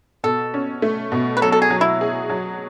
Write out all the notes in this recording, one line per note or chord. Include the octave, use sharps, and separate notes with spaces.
B2 A4
C#4
A3
B2
B4
F#3 A4
A4
G#4
F#3
E4
G#4
F#3